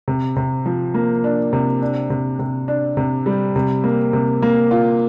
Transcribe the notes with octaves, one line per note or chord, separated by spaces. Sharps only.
C3
C3
F3
A#3
D4
C3
D4
C3
C3
D4
C3
G3
C3
A#3
C3
A#3
F4